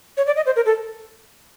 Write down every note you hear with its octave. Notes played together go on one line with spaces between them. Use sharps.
C#5
D5
D#5
C5
A#4
A4